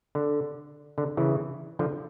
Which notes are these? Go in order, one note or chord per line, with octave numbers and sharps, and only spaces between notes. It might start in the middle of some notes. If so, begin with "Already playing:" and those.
D3
D3
C#3 E3
D3 F3